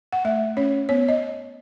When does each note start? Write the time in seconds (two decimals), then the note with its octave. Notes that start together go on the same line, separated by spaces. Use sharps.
0.13 F#5
0.25 A3 E5
0.57 C#4 C#5
0.89 B3 C#5
1.08 D#5